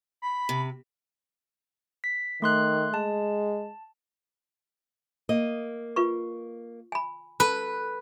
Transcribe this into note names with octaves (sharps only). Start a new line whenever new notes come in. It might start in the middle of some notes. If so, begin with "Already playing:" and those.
B5
C3
B6
D#3 A3 C6 F#6
G#3 A5
A#3 D#5
F4 B4 C#6
G#5 B5
A4 B4